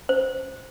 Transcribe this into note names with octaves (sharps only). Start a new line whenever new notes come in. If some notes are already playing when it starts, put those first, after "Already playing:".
C5